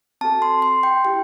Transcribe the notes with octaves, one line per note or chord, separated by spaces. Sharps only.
C4 F#4 A4 A5
C6
C6
G5
E4 G4 G5